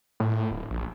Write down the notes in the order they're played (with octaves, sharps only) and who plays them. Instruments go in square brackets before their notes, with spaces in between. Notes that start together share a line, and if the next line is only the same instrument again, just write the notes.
[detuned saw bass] A2
D1
A#1